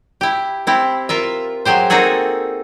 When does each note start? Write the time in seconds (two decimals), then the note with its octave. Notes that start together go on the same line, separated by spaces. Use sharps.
0.21 E4 G4
0.67 C4 E4 G4
1.09 F4 A#4 E5
1.65 F#3 G#3 G4 C5
1.90 A#3 C4 D#4 F#4 G#4 A4